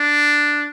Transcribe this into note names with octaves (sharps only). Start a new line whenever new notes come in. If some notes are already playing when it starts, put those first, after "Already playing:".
Already playing: D4